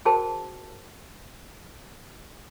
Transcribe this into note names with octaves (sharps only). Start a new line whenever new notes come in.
F#4 G#4 A#4 C5 G5 A5